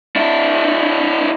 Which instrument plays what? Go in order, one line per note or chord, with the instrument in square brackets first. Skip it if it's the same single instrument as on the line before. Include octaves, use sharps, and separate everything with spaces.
[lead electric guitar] D4 E4